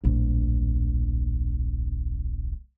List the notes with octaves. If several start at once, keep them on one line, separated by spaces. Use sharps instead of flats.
D1 A#1